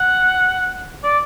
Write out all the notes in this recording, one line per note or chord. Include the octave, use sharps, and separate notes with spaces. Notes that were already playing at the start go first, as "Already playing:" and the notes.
Already playing: F#5
D5